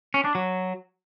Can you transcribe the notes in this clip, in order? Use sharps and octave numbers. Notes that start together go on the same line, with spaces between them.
C#4
D4
F#3